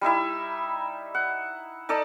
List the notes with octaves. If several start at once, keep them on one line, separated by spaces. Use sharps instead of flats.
G3 D#4 E4 E5
F#5
D#4 A4 D5 A5